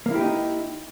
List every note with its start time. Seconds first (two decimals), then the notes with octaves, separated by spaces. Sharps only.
0.06 A#3
0.11 E4
0.16 G4
0.20 D#4